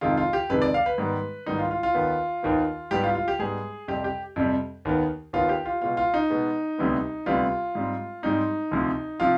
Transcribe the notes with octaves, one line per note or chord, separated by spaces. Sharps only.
F2 C3 D#3 G#3 F4
F4
G4
F2 C3 D#3 G#3 B4
D5
F5
B4
G#2 D#3 G3 B3
G#2 D#3 G3 B3 D#4
F4
F4
F4
D#2 D#3 B3
D#2 D#3 B3
G#2 G3 B3 G4
F4
F4
G4
G#2 G3 B3 G#4
F2 C3 G3 C4 G4
G4
F2 C3 G3 C4
D#2 D#3 B3
D#2 D#3 B3 F4
G4
F4
B2 G#3 B3 F4
F4
D#4
B2 G#3 B3
D2 C3 G3 B3
D2 C3 G3 B3 F4
G#2 G3 C4
G#2 G3 C4 D#4
D2 C3 F3
C3 F3 F4